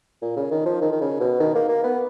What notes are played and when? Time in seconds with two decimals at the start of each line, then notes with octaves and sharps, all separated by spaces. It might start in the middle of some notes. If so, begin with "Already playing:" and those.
0.22 A#2
0.36 C#3
0.51 D#3
0.66 F3
0.82 D#3
0.92 D#3
1.01 C#3
1.20 B2
1.40 D#3
1.55 A#3
1.69 A#3
1.83 B3